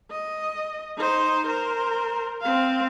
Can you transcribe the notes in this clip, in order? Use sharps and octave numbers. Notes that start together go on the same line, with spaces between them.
D#5
D#4 C5
A#4 C5
C4 F5